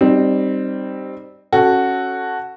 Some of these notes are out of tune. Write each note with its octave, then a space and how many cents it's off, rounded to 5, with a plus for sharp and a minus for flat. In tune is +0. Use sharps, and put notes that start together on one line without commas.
G3 +0 C4 +0 D#4 -25
C#4 -15 F#4 +0 A4 +0